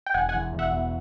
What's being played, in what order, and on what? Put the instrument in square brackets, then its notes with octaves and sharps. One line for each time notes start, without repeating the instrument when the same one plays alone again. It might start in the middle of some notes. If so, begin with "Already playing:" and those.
[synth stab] G5
[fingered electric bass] E1 [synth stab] F#5 G#5
[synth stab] F#5 G#5
[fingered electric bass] E2
[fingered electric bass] E1 [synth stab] E5 F#5
[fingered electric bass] E2